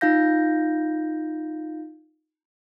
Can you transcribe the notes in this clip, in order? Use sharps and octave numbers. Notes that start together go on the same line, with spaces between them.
D#4 F4 F5 G6 A#6